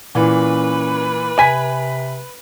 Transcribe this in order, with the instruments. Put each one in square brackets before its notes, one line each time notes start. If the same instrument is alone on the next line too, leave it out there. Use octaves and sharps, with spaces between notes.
[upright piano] A#2 E3 [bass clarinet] C#4 [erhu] B4
[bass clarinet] C3 [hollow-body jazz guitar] G#5 [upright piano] B6